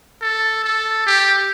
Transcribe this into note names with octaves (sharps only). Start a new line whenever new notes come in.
A4
A4
G4